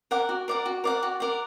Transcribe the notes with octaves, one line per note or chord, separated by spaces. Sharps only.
A#4 D5 F#5
F#4
A#4 D5 F#5
F#4
A#4 D5 F#5
F#4
A#4 D5 F#5